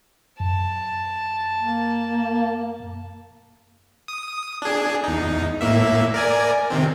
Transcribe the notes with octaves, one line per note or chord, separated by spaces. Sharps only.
F#2 A5
A#3
D#6
D4 G#4
E2 D#4
A2 A#3 E5
A#4 D5 G#5
C3 D#3 C4